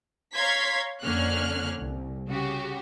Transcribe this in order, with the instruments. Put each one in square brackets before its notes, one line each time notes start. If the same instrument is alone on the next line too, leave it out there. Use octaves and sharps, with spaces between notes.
[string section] C#5 F5 A#5 C6 G#6 B6
F2 D3 A#3 C#4 F6 F#6
C2
C#3 F#4 G4